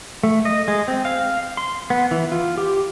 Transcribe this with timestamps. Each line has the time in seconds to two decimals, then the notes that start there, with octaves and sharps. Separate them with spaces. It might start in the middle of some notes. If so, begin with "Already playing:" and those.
0.23 A3
0.45 D#5
0.68 G#3
0.88 C4
1.05 F5
1.57 C6
1.90 B3
2.11 E3
2.32 F4
2.58 G4